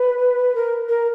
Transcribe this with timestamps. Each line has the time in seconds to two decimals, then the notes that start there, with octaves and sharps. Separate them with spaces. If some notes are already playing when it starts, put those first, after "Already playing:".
Already playing: B4
0.55 A#4
0.89 A#4